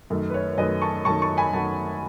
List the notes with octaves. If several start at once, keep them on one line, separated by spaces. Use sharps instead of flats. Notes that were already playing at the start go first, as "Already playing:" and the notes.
F#2 D#3 A3
B4
C#5
C#5
F#2 D#3 A3 B4 D#5
A5 C#6
F#2 D#3 A3 A5 C#6
A5 C#6
G#5 B5
F#2 D#3 A3 F#5 A5